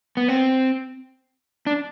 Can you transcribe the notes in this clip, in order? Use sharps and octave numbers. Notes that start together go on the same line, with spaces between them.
B3
C4
D4